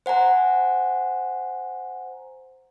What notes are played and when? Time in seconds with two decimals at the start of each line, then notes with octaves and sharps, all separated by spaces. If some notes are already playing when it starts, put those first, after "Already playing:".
0.06 C5 F#5 G#5 A#5